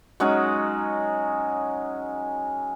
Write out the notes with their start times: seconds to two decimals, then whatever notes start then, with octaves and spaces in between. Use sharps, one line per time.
0.20 F#3 G#3 C#4 D#4